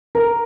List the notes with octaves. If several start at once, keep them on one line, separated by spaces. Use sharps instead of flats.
A#4